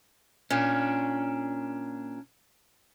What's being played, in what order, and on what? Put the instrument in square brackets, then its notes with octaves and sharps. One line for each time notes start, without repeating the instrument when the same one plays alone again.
[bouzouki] A#2 [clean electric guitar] C#4 D4